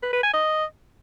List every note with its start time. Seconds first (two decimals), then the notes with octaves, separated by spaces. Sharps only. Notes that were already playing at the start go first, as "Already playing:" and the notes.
0.03 B4
0.13 B4
0.23 G#5
0.34 D#5